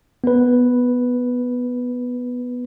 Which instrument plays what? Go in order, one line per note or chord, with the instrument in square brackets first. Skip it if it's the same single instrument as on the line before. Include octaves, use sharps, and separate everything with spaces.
[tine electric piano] B3 B4